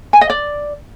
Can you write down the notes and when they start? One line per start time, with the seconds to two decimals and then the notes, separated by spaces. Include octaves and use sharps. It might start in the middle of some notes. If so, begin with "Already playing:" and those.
0.13 G#5
0.21 D#5
0.30 D5